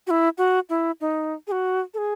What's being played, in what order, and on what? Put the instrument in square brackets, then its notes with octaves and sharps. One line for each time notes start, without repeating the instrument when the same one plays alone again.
[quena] F#4
E4
F#4
E4
D#4
G#4
F#4
A4
G#4